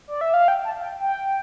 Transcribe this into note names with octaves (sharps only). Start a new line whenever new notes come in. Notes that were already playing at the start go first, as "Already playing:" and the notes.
D5
E5
F5
G5
A5
G5
G5